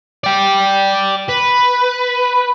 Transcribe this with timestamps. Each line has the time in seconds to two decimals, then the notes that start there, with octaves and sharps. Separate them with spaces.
0.24 D5 G5
1.29 B4